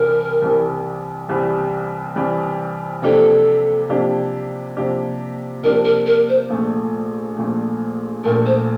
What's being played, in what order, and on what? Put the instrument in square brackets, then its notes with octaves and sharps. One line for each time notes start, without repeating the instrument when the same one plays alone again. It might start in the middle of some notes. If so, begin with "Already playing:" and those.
Already playing: [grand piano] C2 C3 E3 G3 [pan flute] A#4
[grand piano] C2 C3 E3 G3
C2 C3 E3 G3
C2 C3 E3 G3
[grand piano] C3 F3 A#3 D4 G4 [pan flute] A4
[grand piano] C3 F3 A#3 D4 G4
C3 F3 A#3 D4 G4
[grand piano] C3 F3 A#3 D4 G4 [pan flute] A#4
[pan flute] A#4
A#4
C5
[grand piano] A#1 A#2 A3
A#1 A#2 A3
[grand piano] A#1 A#2 A3 [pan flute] A#4
[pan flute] C5